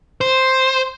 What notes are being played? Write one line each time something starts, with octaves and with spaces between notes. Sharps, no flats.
C5